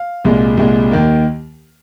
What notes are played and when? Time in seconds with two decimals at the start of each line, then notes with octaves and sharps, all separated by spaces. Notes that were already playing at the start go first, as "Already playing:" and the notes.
Already playing: F5
0.25 C2 A#2 G#3
0.57 C2 A#2 G#3
0.91 D#2 D#3 A#3